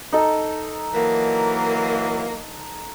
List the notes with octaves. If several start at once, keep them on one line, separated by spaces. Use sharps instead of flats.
D#4 A4
E3 F#3 A#3